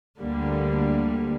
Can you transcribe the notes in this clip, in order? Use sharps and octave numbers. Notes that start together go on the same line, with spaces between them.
D2 D3 G3 A#3